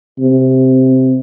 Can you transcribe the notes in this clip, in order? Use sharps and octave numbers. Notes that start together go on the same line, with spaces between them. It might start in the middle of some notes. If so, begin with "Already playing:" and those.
C3